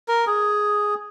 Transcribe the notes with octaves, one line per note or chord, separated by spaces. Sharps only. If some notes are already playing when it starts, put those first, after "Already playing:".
A#4
G#4